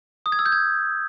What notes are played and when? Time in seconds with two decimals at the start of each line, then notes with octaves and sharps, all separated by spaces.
0.26 D#6
0.32 G#6
0.39 E6
0.46 G6
0.52 G#6